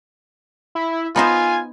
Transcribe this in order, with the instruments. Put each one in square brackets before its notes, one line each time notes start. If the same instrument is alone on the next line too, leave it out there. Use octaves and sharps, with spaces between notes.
[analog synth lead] E4
[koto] B3 D#4 C5 [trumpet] F4 [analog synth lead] G#5